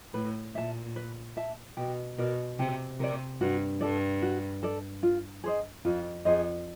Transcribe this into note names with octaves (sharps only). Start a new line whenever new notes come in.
A2 B4
A#2 E5 A5
B4
E5 A5
B2 G4
B2 A#4 D5
C3 G4
C3 A#4 D5
G2 F#4
G2 A4 D5
F#4
A4 D5
F4
G#4 C5 D#5
F2 F4
F2 G#4 C5 D#5